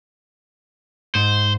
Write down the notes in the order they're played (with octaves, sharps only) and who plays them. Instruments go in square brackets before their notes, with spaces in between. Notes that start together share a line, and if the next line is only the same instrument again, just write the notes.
[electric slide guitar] G#2 [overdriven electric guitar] C5